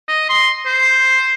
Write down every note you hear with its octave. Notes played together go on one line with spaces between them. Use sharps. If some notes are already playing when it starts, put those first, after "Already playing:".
D#5
C6
C5